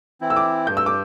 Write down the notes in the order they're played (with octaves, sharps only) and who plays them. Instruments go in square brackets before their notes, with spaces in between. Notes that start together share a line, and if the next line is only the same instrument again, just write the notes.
[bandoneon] E3 C4 E4
[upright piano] E6
D6
[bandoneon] G2 [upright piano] G6
[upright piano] E6
D6